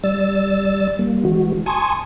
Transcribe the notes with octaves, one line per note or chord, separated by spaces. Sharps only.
G3 D5 E6 A6
G3 A#3
E3 G#3 F#4
G#5 A5 C6 C#6 D#6 G#6